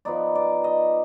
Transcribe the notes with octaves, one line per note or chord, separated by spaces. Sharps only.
F3 B3 D#4 D5
D5
D#5